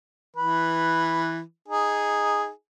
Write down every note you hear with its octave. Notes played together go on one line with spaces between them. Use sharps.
E3 B4
D#4 G#4